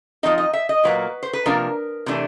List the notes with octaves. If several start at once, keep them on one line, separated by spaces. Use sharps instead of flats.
F3 A3 C4 D#4 D#5
D#5
E5
D#5
A#2 F#3 A#3 B4
C5
B4
C3 F3 A#3 D4 A#4
C3 E3 A3 D4